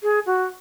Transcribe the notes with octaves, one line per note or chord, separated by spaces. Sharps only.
G#4
F#4